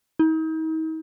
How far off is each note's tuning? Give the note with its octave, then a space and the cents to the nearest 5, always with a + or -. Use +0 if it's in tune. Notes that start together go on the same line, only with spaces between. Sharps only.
D#4 +40